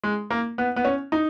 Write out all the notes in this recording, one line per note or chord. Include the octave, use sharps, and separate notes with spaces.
G#3
A#3
B3
B3
C#4
D#4